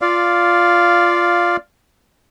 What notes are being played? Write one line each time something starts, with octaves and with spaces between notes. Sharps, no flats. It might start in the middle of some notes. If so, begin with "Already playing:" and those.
F4 D5 F5